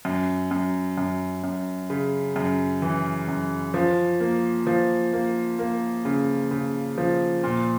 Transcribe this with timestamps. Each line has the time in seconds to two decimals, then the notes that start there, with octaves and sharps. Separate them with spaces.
0.05 F#2
0.51 F#2
0.98 F#2
1.44 F#2
1.90 C#3
2.36 F#2
2.82 E3
3.28 F#2
3.74 F3
4.20 A#3
4.67 F3
5.13 A#3
5.59 A#3
6.05 C#3
6.51 C#3
6.98 F3
7.44 A#2